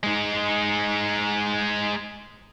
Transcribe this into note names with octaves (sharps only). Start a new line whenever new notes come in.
G#3 D#4